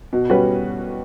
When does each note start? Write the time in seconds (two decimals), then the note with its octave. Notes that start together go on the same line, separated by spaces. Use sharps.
0.13 B2
0.30 G3 C#4 F#4 B4